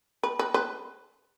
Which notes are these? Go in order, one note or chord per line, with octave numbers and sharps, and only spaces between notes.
B4
B4
B4